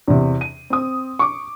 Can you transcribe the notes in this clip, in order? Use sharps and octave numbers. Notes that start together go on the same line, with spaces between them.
E2 C3
D#7
C4 D#6
C#6 D6